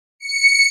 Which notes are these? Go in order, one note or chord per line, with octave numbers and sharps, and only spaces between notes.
C#7